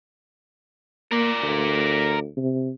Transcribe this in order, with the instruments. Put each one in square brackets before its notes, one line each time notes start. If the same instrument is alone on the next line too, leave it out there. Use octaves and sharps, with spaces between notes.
[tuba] A#3 [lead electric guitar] A#4 D5
[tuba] D2
C3